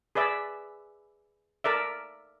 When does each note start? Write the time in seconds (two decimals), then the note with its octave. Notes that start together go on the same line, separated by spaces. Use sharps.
0.15 G#4 B4 D5 E5
1.64 A4 A#4 D5 E5